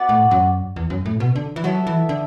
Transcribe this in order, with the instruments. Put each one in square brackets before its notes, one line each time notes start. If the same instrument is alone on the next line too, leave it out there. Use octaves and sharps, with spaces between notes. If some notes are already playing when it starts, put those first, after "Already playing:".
Already playing: [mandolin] B3 F#4 B4 D5
[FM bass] A2
F#2
E2
F#2
A2
B2
D3
E3
[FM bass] F#3 [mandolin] B3 E4 A4 E5
[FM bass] E3
D3